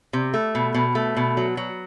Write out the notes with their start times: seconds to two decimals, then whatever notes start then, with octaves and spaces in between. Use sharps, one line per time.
0.13 C3
0.34 A3
0.55 B2
0.74 B2
0.95 A3
1.17 B2
1.37 F#3
1.57 F#3